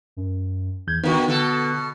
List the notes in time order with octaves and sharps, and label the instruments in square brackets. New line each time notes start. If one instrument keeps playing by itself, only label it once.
[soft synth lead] F#2
[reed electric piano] E2 G6 [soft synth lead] G#6
[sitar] D3 D#3 [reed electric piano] B3 F#4 [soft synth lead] D#4
[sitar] B2 A4 [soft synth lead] D3